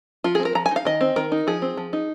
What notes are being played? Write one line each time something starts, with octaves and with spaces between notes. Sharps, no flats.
F3 F4
C4 G#4
A#4
F3 A#5
G#5
D#4 F5
D#3 D#5
C4
D#3 A#4
D#4
F3 G#4
C4
F3
D#4